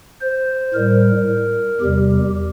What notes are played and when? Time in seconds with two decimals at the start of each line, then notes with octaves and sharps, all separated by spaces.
0.21 C5
0.74 A2 G3 A#4
1.81 E2 C3 G3 G4